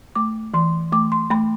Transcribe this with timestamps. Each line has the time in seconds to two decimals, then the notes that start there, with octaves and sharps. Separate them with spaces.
0.16 A3 D6
0.54 E3 C6
0.92 A3 D6
1.12 C6
1.31 A3 B5